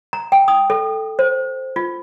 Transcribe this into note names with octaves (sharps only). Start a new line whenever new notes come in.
A#5
G5
D#6
A4
C5
F4